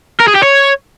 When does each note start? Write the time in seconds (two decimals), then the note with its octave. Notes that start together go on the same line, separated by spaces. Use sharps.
0.20 A#4
0.28 G#4
0.36 G4
0.43 C#5